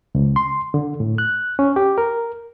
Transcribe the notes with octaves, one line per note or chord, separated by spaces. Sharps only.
C#2
C6
D3
A2
F#6
C#4
G4
A#4